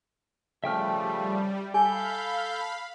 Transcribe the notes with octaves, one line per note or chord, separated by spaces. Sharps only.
C#3 F3 G3 A3 E5 G5 F6
G4 A4 F5 G#5 B5 D6 G6